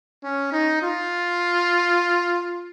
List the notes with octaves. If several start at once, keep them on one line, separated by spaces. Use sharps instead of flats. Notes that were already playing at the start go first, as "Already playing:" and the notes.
C#4
D#4
F4